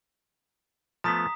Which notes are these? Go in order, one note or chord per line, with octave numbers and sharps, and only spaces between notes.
F3 A3 B3 A#5 D#6 B6